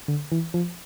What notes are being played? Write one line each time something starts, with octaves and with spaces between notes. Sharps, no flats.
D3
E3
F3